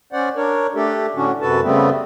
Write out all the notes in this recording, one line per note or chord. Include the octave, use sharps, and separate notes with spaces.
C#4 C5 D5 F#5
D4 A#4 C#5
A3 D4 G4 A4
A2 D3 C#4 D4 F#4
F#2 C3 F#4 A4 B4 A5
C#3 G3 A3 B3 C4